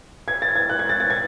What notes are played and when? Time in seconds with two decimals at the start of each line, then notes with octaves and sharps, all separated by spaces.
0.28 G#6
0.42 A6
0.56 G#6
0.69 F#6
0.79 G#6
0.89 A6
1.00 A6
1.10 G#6